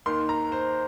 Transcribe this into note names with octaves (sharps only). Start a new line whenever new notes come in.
D#2 D#3 C6
A#5
C5